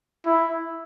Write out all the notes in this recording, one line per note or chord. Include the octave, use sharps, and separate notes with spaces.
E4